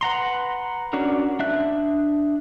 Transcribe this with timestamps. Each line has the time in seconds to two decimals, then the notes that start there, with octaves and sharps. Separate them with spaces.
0.01 B4 F#5 A#5 C6
0.93 C#4 D4 F#4 A#4
1.39 D4 E5 F#6